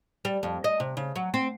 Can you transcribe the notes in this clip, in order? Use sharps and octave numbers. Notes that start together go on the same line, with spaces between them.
G3
F2
D#5
C3
C#3
F#3
C4